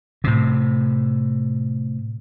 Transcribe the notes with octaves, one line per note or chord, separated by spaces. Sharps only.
A2 C3